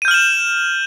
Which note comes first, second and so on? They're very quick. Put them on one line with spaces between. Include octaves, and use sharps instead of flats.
D#7 G6 F6 F#7 E7